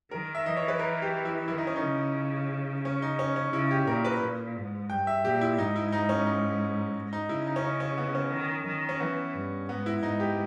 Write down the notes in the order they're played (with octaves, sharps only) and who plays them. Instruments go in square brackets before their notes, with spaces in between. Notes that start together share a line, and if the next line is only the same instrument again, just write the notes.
[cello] D#3 [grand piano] A#4
[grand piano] E5
[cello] E3 [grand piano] D#5
[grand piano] C#5
B4
A#4
G4
E4
[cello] D#3 [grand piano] E4
[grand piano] D#4
C#4
D#4
[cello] C#3
[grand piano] C#4
D#4
C#4
C#4
[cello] C#3 [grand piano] E4
[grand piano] G4
[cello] A#2 [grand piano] A#4
[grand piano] B4
[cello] A#2
G#2
[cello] G2 [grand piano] G5
[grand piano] E5
[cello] A#2 [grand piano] G4
[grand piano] E4
[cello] G#2 [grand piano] D#4
[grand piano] E4
D#4
C#4
D#4
[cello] G#2
[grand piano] D#4
[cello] C#3 [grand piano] E4
[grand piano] D#4
C#4
D#4
C#4
B3
C#4
[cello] D#3
D#3
[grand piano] C#4
[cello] E3 [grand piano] B3
[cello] G2
[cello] G#2 [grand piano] B3
[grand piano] E4
[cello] G#2 [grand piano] D#4
[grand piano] G4